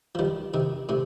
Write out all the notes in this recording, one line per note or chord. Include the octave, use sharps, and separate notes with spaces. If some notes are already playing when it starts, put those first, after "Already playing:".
F3
D#3 G3
C3 D#3
A2 C3